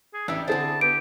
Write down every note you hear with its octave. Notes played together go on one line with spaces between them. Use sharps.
G#4
A1 D4 G4 E5
D3 C4 E4 G#4 A5
B3 G4 D7